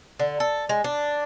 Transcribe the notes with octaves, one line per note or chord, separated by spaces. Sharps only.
D3
A4
G#3
D4